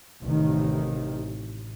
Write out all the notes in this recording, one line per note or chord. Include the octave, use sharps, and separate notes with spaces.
A1 C3 D#3